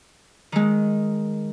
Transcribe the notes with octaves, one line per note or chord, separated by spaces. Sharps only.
D#3 G#3